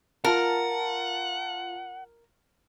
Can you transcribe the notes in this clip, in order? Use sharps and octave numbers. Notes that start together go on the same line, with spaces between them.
F4 A#4 F#5 A5